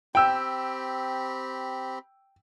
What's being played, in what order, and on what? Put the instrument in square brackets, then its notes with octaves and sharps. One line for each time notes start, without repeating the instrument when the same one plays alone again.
[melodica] C4 G4 B5 [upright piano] G5 E6